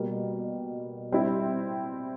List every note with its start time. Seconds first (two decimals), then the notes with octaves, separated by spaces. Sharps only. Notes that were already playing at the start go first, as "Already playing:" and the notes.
Already playing: B2 G3 A#3
1.12 G3 C4 E4